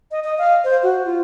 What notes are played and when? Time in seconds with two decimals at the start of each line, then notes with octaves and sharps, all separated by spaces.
0.11 D#5
0.24 D#5
0.38 F5
0.64 C5
0.83 F#4
1.05 F4